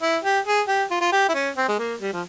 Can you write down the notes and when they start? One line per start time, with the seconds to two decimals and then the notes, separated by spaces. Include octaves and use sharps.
0.02 E4
0.24 G4
0.46 G#4
0.68 G4
0.91 F4
1.01 F4
1.12 G4
1.29 E4
1.34 C#4
1.56 C4
1.68 G#3
1.79 A#3
2.01 G3
2.13 F3